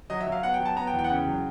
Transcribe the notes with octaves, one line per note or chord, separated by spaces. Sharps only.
F#3 D#5
E5
F#3
F5
B3 F#5
G5
F#3
A5
B3 A#5
G5
E2
G5
F#5
C#3 G5
F#3